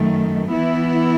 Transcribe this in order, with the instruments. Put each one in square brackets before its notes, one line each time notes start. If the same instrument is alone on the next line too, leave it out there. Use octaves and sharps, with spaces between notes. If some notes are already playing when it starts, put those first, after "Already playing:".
Already playing: [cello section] F#2 D#3 A3
E3 B3 E4